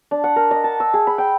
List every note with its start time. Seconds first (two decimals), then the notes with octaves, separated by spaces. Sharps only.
0.11 D4
0.24 F#5
0.36 A#4
0.51 D#5
0.64 A5
0.80 E6
0.94 G#4
1.07 B5
1.18 G5